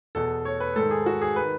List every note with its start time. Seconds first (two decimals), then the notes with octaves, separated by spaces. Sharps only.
0.15 E2 B2 A4
0.45 C#5
0.60 B4
0.76 G#2 D#3 A4
0.91 G#4
1.06 F#4
1.22 G#4
1.36 D#3 B4